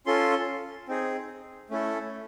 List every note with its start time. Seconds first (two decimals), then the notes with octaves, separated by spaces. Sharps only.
0.06 C#4 F4 A4 C6
0.88 C4 D#4 G#4
1.70 A3 C#4 E4 A4